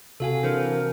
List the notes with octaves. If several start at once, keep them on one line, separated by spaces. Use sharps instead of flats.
C3 F#4 A4 F5 G#5
E3 D4 A#4 C5